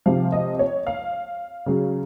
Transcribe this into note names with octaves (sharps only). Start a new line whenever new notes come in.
C3 F3 F5
D#5
C#5
F5
C#3 F#3